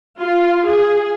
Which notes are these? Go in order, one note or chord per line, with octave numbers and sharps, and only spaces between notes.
F4
G#4